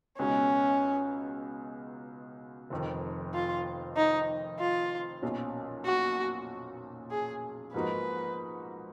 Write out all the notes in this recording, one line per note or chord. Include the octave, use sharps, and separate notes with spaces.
C#2 B2 G#3 C#4 D#4 F#4
F1 F2 D#3
F4
D#4
F4
B1 A#2 F#3 C#4
F#4
G#4
G#2 F3 A#3 D#4 F#4 B4